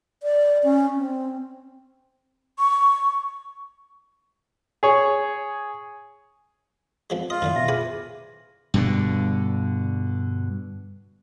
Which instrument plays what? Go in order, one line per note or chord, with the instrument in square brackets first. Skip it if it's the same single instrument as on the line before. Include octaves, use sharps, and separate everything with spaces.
[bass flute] D5
C#4
C4
[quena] C#6
[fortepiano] G#4 C#5
[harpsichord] F2 F3 G#3
[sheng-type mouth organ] F4 [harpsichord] D#5
[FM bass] F#2 [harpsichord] A2 D3 D#3
[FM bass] B2 [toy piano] E5
[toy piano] G#4 [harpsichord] B4 G5 G#5
[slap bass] G2 B2 D3